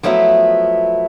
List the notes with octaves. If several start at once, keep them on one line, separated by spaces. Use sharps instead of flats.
F3 F#3 A3 B3 E4